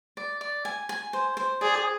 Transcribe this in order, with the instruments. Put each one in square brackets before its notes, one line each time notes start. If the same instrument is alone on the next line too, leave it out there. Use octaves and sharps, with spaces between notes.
[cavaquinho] D5
D5
G#5
G#5
C5
C5
[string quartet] G#4 [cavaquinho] D5